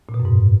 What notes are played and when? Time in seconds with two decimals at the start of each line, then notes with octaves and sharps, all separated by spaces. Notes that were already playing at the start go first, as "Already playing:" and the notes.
0.09 A#2
0.14 B2
0.20 F#2
0.25 G#2